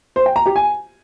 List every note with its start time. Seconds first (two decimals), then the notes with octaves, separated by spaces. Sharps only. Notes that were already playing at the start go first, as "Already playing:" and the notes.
0.16 C5
0.26 G5
0.36 A#5
0.46 G4
0.56 G#5